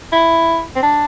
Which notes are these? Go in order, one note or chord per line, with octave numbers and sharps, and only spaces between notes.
E4
C4
D4